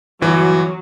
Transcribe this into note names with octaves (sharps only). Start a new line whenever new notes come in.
G1 E3 F#3